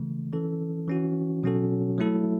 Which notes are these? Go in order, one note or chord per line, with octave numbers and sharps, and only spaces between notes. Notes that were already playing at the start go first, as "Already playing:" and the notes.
Already playing: C#3 E3 A3
E3 C#4 A4
E3 C#4 F#4
B2 F#3 C#4 F#4 A4
F#3 A3 E4 A4